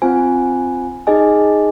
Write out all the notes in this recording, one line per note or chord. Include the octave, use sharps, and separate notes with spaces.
C4 F4 C5 G#5
D#4 G#4 D#5 G#5